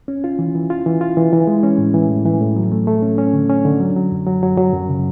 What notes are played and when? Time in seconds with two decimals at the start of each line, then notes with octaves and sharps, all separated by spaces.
0.08 C#4
0.24 F4
0.39 E3
0.55 E3
0.70 F4
0.86 E3
1.01 F4
1.17 E3
1.33 E3
1.47 G#3
1.63 C#4
1.78 A2
1.94 E3
2.10 A2
2.26 E3
2.41 A2
2.56 F#3
2.72 A3
2.87 A3
3.02 C#4
3.18 C#4
3.34 D3
3.50 C#4
3.65 D3
3.80 F#3
3.96 F#3
4.12 F#2
4.27 F#3
4.43 F#3
4.57 F#3
4.73 F#2
4.89 C#3